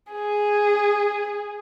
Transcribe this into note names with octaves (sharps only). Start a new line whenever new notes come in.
G#4